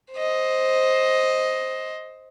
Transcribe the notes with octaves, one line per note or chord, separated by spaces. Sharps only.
C5 D#5